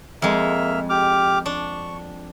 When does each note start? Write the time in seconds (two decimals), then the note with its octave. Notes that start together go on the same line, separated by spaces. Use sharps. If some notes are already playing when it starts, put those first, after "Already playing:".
0.22 F2 G#3 A#3 E5 F6
0.90 G4 D6 F6
1.46 D4 C#6